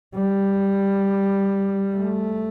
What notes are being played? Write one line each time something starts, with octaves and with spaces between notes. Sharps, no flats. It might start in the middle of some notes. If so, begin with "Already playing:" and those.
G3
A3